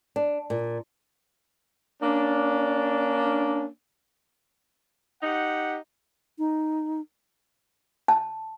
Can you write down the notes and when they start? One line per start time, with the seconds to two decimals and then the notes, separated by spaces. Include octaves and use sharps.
0.16 D4
0.50 A#2
2.02 A#3 C#4 D4
5.23 D#4 G4 F#5
6.39 D#4
8.08 A5